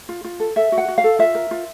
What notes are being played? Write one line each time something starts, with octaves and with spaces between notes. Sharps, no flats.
F4
F4
A4
A4 E5
F#4
F#5
F#4
F5
A4
F4 E5
A#4
F4